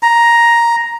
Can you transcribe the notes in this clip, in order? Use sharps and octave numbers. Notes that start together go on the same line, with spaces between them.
A#5